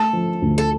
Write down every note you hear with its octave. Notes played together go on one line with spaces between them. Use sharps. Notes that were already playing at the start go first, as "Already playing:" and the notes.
Already playing: A3 A4
F3
D2
A4